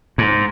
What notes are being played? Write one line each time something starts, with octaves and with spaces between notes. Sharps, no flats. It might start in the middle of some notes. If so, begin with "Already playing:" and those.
G#2